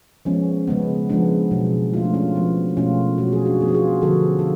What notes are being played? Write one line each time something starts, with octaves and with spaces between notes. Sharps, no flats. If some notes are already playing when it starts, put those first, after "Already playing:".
F3 G#3 B3 C#4
C#3 G#3 B3
F3 G#3 B3 D4
B2 F#3 B3
F3 A3 F4
D4
C#4 F4
F3 G#3 B3
B2 A3 C#4 F4
B2 F#3 A3 F#4
G#4
D4 F#4
F3 B3 G#4
F#4
F4 G#4
D3 F3 B3 F#4 A4
A4